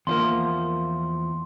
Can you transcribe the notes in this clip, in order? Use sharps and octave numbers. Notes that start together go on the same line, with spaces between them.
E2 F3 A#3 C6